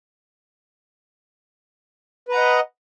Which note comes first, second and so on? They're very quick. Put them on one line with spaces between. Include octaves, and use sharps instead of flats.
B4 A#5 F#5 D#5